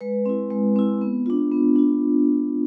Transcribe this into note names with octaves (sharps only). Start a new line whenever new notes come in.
G#3 B4
C4 E4
G#3
C4 E4
B3
D4 F4
B3
D4 F4